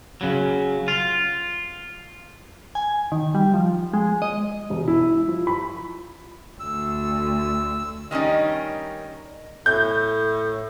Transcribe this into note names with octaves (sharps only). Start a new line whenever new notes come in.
C#3 F#3
F4
G#5
D#3
G3
F3
G#3
D#5
E1
E4
F3
B5
D2 E6
D#3 G3 C#4 D#4
A2 G6